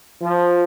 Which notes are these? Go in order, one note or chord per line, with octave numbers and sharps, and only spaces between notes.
F3